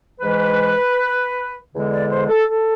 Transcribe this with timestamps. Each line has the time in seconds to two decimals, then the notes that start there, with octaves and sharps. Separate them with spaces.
0.20 G#2 E3 G#3 B4
1.72 E2 D3 G#3
1.91 D5
2.10 C5
2.29 A4
2.49 A4